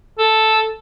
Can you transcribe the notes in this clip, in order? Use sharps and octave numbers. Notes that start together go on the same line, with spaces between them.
A4